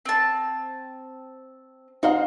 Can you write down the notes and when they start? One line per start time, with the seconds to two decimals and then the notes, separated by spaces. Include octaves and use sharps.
0.05 C4 A5
2.03 D#4 F#4 C5 F5